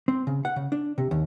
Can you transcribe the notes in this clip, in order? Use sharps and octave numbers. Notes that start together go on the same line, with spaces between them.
C4
C#3
F#5
C#3
D4
C3
D#2